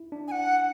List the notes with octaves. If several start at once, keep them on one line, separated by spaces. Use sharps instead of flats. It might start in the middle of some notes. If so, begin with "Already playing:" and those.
Already playing: E4
D4
G#5
F#5